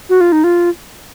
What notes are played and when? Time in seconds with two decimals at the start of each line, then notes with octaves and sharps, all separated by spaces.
0.09 F#4
0.21 F4
0.32 D#4
0.44 F4